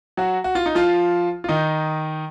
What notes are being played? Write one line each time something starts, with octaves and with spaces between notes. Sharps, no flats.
F#3 F#4
F#4
F4
D#4
F3 F4
F4
D#3 D#4